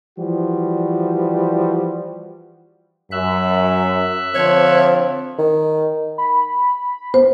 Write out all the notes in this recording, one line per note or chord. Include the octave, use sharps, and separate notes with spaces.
E3 F3 G3 F#4
F#2 E5 F#6
D3 F3 C4 C#5
D#3
B5
B3 C5